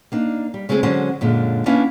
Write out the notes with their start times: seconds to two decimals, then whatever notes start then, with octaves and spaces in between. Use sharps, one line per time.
0.12 A#3 D4 D#4
0.54 G3
0.69 C#3 G#3 A3 C4 G#4
0.83 D3 F#3 G#3 C#4 G#4 C5
1.21 F#2 A#2 D3 G#3
1.66 A#3 B3 C#4 D4 E4